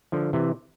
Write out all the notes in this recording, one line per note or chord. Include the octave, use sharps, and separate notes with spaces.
D3 F3
C3 E3